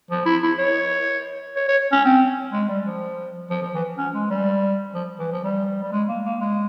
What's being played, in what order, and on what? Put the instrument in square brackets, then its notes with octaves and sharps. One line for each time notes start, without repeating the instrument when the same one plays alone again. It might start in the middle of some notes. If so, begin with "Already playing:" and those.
[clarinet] F3
E4
E4
C#5
C#5
C#5
C#4
C4
G#3
G3
F3
F3
F3
E3
C#4
G#3
G3
F3
E3
F3
G3
G3
G#3
A#3
A#3
G#3